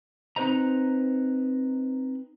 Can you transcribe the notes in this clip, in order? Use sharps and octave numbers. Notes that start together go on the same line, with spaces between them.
C4 D#4 B4 C5 D#5 A#5